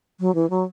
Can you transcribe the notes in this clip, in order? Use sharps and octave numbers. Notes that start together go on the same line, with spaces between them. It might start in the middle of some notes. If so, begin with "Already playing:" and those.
F#3
E3
F#3